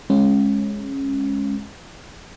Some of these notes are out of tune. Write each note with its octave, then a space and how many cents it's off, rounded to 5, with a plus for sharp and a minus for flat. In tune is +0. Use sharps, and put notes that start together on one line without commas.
G#3 +0 C#4 -20